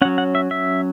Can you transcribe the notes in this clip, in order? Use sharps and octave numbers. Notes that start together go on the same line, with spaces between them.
F#3 C#4 F#5
F#5
E5
E5